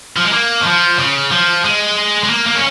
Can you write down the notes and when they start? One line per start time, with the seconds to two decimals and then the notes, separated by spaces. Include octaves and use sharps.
0.17 F3
0.25 G#3
0.33 A#3
0.61 D#3
0.67 F3
0.98 C#3
1.31 F3
1.65 G#3
2.23 G#3
2.30 A#3
2.46 A#3
2.55 C#4